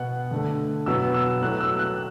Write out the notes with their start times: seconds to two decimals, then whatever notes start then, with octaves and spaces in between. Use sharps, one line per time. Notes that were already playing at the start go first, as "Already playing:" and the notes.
Already playing: B2 B3 F#5
0.31 D3 A3
0.86 B2 F#3 B3 E6
1.14 E6
1.42 A2 F#3 A3 F#6
1.61 E6
1.79 F#6